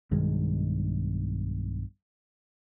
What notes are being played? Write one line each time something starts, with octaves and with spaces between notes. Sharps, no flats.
B1 G2 D#3 G#3